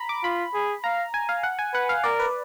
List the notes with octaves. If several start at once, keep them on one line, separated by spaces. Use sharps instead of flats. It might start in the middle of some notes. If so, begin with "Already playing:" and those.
Already playing: A#5 B5
D6
F4 B5
G#4
F5 A#5
G#5
F5
F#5
G#5
B4 F#5
F5
A#4 D5
B4